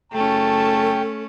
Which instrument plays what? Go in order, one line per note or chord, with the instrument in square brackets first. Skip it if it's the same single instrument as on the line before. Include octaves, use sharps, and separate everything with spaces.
[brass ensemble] F#1 A5 [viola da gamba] A3 C#4 [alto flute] A4 [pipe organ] G5